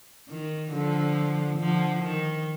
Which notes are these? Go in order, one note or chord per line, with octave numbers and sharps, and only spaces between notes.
D#3
D3 F3
D3 F3
D#3